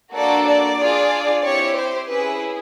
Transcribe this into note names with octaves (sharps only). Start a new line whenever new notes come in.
A#3 D4 F#4 A4 D5
D5
D4 F4 G#4
C4 E4 G4 C#5
C5
C#4 E4 G#4 B4